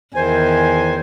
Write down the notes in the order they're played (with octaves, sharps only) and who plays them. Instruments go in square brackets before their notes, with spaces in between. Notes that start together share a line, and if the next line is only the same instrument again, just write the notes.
[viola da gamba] E2 [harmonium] D#3 G#5 [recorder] C5